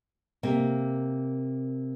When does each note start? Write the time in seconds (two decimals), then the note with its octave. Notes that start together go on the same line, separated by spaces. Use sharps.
0.43 C3 A#3